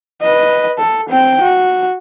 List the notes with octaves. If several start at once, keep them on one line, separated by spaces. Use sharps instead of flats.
B4 D#5
A4
C4 G5
F#4